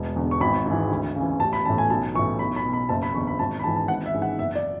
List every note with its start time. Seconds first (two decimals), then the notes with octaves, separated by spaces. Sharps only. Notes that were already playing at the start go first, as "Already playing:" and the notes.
Already playing: E1
0.16 E2 D3
0.31 C#6
0.40 G#1 B5
0.66 G#2 E3
0.90 D2
1.16 C#3 E3
1.40 A1 A5
1.53 B5
1.65 A2 E3 A5
1.78 G#5
1.90 B1 A5
2.15 E3 C#6
2.19 A2
2.39 B1 B5
2.56 B5
2.65 B2
2.73 B5
2.89 F#1 A5
3.03 B5
3.14 E2 D3 C#6
3.27 B5
3.39 G#1 A5
3.60 B5
3.64 G#2 E3 A5
3.76 A5
3.88 G#1 F#5
4.06 E5
4.14 G#2 E3
4.22 F#5
4.39 F#1 E5
4.55 D5